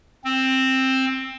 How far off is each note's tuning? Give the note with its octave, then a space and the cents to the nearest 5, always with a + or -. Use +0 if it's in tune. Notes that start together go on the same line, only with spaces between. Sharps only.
C4 +10